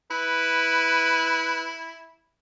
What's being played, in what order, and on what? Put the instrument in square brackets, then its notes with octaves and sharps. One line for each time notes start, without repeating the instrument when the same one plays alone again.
[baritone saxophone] E4 [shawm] B4